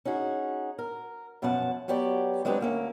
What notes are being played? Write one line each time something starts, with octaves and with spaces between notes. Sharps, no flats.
C#4 D#4 F#4 G#4
A#4
F#2 B2 F3 C#4 F#5 A5
F#3 B3 G4 C#5 D5
F#3 G#3 C4 D4 G4 B4
D2 A#3 C#4